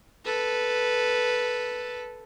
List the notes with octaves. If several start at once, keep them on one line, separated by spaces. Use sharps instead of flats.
A4 B4